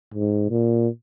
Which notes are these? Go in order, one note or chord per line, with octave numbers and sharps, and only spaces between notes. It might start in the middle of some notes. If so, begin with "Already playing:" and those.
G#2
A#2